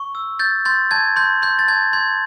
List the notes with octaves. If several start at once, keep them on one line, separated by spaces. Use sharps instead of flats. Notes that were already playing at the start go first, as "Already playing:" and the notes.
Already playing: C#6
E6
G6 A6
C6 G6 A6
A5 G#6
C6 G6
C6 G6
A6
A5 G#6
C6 G#6